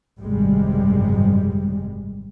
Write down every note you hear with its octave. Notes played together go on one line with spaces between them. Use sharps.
G#1 C#2 F#2 C3 G3 G#3